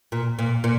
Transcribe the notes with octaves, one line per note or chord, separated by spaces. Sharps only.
A#2
A#2
A#2